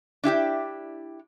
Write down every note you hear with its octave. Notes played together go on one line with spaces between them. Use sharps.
D4 E4 G4 G5